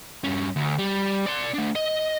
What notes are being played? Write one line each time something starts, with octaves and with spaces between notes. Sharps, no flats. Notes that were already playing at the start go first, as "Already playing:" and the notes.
G2 C#4
D2
G3
D5 C6
A3 D4
D#5